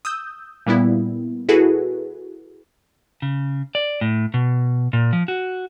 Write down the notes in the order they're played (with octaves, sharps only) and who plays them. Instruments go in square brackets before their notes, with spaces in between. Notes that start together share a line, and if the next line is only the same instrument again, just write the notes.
[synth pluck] D#6 E6 G6
A#2 G3 B3 E4
E4 F#4 G#4 A4 B4
[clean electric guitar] C#3
D5
A2
B2
A#2
F3
F#4